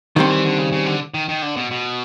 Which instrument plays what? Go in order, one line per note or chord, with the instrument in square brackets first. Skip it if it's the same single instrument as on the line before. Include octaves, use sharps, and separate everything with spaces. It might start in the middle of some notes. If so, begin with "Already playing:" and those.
[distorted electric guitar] D3 [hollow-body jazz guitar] D#3 G3 C4
[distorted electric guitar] E3
D3
C#3
C#3
D3
D#3
D#3
D3
B2
B2